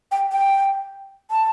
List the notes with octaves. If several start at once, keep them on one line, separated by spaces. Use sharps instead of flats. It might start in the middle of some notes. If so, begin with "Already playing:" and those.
G5
G5
A5